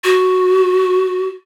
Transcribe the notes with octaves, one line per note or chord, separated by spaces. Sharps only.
F#4